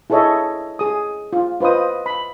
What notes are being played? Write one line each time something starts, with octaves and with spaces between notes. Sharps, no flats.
E4 G#4 A4 C#5 D#5 E5
G#4 D#6
F4
F4 B4 C5 D#5 D#6
B5